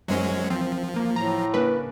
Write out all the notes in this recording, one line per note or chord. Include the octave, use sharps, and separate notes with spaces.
F#2 F#3 G#3 C#4 C5
F3 C4
A#3
A2 A#5
C#3 A#3 D4 B4